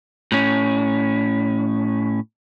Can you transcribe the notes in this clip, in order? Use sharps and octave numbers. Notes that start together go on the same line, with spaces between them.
A2 C#4